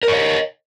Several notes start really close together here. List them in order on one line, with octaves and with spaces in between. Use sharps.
A#4 C#5 D#5